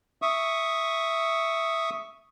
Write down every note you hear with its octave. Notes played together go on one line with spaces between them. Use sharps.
E5 C#6 D#6